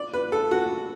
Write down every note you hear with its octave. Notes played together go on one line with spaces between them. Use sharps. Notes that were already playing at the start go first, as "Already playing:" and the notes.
Already playing: D5
B4
A4
F#4